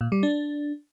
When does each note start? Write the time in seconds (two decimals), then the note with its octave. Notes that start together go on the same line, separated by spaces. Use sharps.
0.01 A#2
0.12 G3
0.23 D4